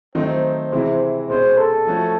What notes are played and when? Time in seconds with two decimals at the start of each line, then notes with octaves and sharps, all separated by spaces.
0.15 D#3 F#3 A3 C4 D#4 C5
0.72 C3 E3 G#3 C4 E4
1.29 B2 G#3 C#4 C5
1.58 A4
1.87 F3 A3 C#4 F#4